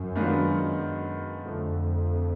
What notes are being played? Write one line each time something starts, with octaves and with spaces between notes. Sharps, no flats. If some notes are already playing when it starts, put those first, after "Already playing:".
Already playing: F#2
D#3 G#3 B3 D4 F4
F2 D3 F3 A3